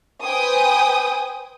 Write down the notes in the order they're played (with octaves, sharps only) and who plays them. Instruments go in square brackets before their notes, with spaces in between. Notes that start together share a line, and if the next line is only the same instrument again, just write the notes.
[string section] B4 C5 G5 G#5 D#6